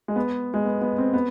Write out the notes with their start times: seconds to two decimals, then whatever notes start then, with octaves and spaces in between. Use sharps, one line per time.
0.08 G#3
0.16 B3
0.54 G#3
0.65 B3
0.81 B3
0.98 C4
1.13 B3